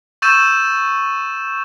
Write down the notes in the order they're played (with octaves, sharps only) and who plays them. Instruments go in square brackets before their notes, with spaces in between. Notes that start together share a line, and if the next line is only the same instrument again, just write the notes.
[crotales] C#6 E6 G6 A6 D#7 E7